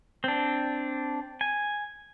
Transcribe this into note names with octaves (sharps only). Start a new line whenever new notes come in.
C4 D4
G#5